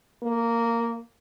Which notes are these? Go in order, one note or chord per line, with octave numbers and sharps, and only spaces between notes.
A#3